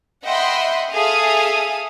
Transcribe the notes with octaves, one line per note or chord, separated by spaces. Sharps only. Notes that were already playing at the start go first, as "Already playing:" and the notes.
D#5 E5 F#5 G5 B5 C6
G#4 A4 E5 F5 D#6